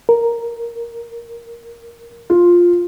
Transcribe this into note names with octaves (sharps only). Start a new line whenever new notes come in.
A#4
F4